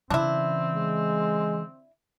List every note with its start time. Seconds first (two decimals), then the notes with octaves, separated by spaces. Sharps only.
0.10 C#3 E3 C4 D4 E4
0.76 G#3